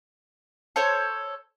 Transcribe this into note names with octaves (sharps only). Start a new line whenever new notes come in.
A4 C5 C#5